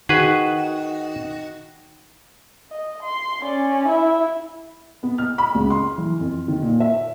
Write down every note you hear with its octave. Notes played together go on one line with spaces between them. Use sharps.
D#3 F#4 G#4 B4
D#5
C6
C#4 D5
E4 E5
B3
F6
B5
C#2
C6
E3
F2
D#3
A#2
E5